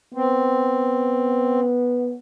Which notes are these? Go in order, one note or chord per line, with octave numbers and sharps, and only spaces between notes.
B3 C4